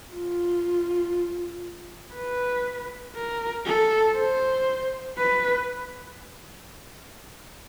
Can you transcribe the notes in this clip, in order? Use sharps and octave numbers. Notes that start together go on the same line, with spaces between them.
F4
B4
A#4
A4
C5
B4